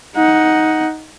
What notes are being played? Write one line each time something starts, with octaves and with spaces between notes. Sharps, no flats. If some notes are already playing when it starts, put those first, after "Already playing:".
D#4 F#5